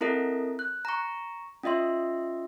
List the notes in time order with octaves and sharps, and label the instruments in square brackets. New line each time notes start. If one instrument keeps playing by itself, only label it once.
[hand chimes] C4 E4 A4 A#4 D#5
F#6
A#5 C#6
C#4 F4 D#5 E5 C6